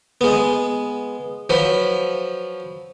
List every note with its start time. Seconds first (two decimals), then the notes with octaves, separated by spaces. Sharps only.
0.21 G#3 B3
1.50 F3 F#3 B4